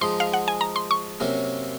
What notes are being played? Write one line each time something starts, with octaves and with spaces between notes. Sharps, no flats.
F3 G#3 D#4 C6
F5
F#5
G#5
A#5
C6
C#6
C3 F#3 A#3 C#4